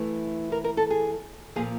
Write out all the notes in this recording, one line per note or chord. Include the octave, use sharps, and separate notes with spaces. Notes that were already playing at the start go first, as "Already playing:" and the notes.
Already playing: E3 A3
A#4
A#4
A4
G#4
A#2 F3 A#3 G#4